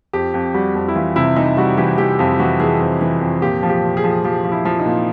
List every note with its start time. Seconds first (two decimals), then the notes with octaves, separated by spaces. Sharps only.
0.13 F2 G4
0.34 F2
0.54 G3 F#4
0.75 F2
0.88 E4
0.95 E3 F4
1.16 C3 E4
1.36 E3 D#4
1.57 G3 F#4
1.77 E3 G4
1.98 E3 G4
2.19 F2 F4
2.39 E3 F#4
2.60 E3 G#4
2.80 F2
3.01 E3
3.21 F2
3.42 A#2 G4
3.63 F3
3.69 G4
3.83 A#2
3.97 G#4
4.04 F3
4.24 F3 G4
4.44 F3
4.52 E4
4.65 F3
4.79 D#4
4.86 A#2